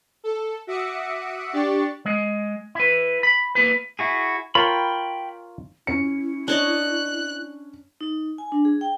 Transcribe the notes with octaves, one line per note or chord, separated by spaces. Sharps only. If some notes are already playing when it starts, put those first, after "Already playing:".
A4
F#4 E5 D6 D#6 C#7
D4 G4 D5 C#6 A6 C#7
G#3
E4 B4
B5
A#3 E4 B4
E4 F#4 G#4
F4 A#4 C#5 G5 B5
C#4 E4 C#7
D4 C#5 D#5 F#6
D#4
G#5
D4
G#4
G5